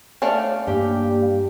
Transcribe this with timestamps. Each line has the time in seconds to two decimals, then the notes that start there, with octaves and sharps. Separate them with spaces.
0.22 A3 C#4 D4 F5
0.67 G2 G3 A#3 G4